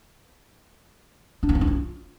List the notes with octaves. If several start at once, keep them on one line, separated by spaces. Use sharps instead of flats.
D4
A#3
C#4
D4
F4